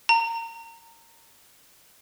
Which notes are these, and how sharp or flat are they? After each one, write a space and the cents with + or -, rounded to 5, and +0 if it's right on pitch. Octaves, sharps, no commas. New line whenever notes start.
A#5 -25